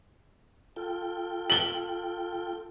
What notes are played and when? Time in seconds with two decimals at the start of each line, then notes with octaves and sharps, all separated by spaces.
0.76 F4 A4 G5
1.50 F#7 G7